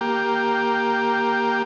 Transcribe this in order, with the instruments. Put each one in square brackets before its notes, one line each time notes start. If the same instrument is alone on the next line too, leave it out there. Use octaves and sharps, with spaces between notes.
[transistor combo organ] A#3 G4